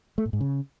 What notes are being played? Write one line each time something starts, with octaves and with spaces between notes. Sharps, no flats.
A3
A2
G#2
C#3